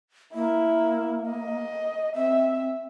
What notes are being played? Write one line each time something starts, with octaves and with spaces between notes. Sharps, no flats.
A#3 E4
D#5
C4 E5